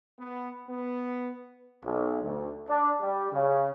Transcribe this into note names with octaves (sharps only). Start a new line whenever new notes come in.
B3
B3
B1
D2
D4
G3
C#3